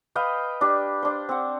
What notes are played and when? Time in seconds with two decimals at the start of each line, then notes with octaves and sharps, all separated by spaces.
0.15 B4 D#5 F5 G5
0.61 D4 G4
1.02 D4 C5
1.29 C4 F#5